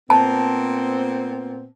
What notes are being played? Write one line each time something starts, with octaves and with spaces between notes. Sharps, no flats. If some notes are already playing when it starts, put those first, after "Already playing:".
A#2 B3 C4 A5